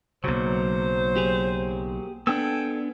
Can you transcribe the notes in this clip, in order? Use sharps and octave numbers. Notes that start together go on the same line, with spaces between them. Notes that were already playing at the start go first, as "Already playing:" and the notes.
B1 C#3 F#3 A#3 C5
G4 G#4
B3 D4 A4 G5 G#5 E6